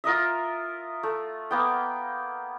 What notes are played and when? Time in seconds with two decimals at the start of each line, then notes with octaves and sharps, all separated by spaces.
0.04 F4 A#4 D#5 E5
1.03 A3
1.51 A#3 B3 G5